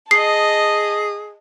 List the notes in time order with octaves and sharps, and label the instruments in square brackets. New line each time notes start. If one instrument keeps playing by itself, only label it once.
[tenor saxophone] G#4 [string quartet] D#5 A5 [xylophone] C7